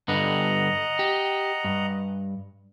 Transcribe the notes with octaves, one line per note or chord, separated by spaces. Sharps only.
G2 D3 B4 D#5 F#5 A#5
G4
G2